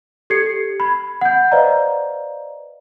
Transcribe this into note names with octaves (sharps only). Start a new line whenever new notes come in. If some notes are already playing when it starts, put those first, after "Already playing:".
G4 A4 G#6 C7 C#7
B5 G#6
F#5 G6
B4 C5 D5 D#5 F5 A#5